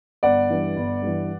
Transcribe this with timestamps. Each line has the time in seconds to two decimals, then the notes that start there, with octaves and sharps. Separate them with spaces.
0.23 G1 D5 F#5
0.50 G2 E3
0.76 G1
1.02 G2 E3